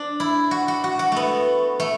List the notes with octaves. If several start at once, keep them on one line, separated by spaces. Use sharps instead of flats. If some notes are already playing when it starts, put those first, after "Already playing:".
Already playing: D4
E4
F#4
F#4
F#4
F#4
A3 B3
A3